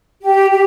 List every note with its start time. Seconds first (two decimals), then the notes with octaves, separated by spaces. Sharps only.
0.22 G4
0.50 G4